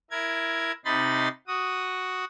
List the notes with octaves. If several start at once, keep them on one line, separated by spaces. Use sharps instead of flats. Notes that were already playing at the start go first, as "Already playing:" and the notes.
E4 A#4 G#6
C3 D#4 B5 C6 A6
F#4 D#6